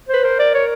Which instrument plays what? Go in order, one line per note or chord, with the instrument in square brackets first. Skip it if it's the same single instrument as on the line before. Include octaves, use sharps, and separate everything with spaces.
[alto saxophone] B4 [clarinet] C5
[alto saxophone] A#4 [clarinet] C5
[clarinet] D5
C#5